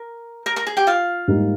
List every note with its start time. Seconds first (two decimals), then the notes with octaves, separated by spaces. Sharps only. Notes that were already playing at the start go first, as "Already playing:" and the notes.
Already playing: A#4
0.46 A#4 A#5
0.56 A#4 A#5
0.67 G#4 G#5
0.77 G4 G5
0.87 F4 F5
1.28 G#2 G3 A#3 D#4